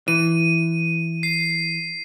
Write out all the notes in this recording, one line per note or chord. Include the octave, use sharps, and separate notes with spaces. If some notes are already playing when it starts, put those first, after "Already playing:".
E3 D#7
C7